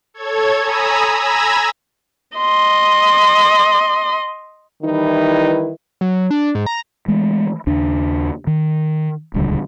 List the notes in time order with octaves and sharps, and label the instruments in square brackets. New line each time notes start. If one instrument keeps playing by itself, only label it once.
[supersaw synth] A4 C#5 G#6
G#5 A#5 B5 D#6 E6
G#5 A#5 B5 E6 G#6 A#6
[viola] D#5 C6
[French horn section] D#3 E3 G3 D#4 E4 B4
[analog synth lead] F#3
D4
G#2
A#5
[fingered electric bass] E3 G#3 A3
D#2 C#3 D4
D#3
D#1 C#2 D3 G3